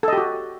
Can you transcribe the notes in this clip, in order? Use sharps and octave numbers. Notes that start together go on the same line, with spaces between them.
F#4 G4 A4 D#5